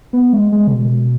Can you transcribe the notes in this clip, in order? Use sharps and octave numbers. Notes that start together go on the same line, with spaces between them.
B3
G#3
G#3
C#3
B2